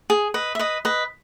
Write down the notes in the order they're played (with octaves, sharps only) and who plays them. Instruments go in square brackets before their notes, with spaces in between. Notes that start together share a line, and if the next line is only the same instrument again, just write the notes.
[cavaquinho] G#4
B4 D#5
E5
B4 D#5
B4 D#5